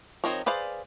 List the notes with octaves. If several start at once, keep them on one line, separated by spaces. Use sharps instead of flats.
F3 C4 D#4 A#4 C#5
G#4 B4 C5 D5 F5